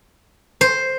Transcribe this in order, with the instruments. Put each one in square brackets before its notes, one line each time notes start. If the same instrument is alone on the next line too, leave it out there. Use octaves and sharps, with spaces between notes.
[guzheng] C5